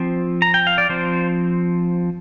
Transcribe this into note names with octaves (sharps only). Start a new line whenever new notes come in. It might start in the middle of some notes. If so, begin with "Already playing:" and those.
Already playing: F3 C4
A#5
G5
F5
D5
F3 C4 C5